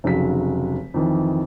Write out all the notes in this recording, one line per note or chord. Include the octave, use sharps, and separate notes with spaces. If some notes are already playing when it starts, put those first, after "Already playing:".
F1 C#3 F#3 B6
F2 D#3 E3